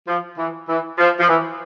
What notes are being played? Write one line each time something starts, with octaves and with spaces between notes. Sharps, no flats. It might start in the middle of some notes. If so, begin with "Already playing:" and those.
F3
E3
E3
F3
F3
E3